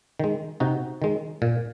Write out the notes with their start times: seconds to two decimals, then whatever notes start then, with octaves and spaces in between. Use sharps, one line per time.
0.20 D#3 G#3
0.60 C3 D#4 F#4
1.02 D#3 G#3
1.42 A#2